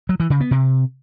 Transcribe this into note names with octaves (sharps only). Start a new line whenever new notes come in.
F#3
E3
C#3
B3
C3